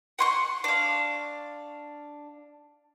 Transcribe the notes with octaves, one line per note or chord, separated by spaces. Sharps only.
F#5 C6 C#6
D4 F5